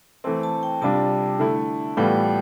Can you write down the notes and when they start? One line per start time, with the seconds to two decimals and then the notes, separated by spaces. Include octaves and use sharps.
0.24 E3 A3 C4 A5
0.43 A5
0.63 G5
0.81 C3 G3 D4 F4 A5
1.39 D3 A3 E4
1.97 A2 E3 G3 B3 F4 G5